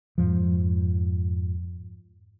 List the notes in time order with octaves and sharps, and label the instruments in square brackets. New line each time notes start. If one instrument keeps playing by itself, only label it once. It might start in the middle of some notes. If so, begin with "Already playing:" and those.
[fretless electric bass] F2 G#2 F3